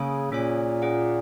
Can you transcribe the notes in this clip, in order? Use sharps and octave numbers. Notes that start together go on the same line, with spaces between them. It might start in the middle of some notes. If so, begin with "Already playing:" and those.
Already playing: C#3 A#3 C#4 G#4 C#5 G#5
A#2 A#3 C#4 G#4 C#5 G#5
C#4 G#4 F#5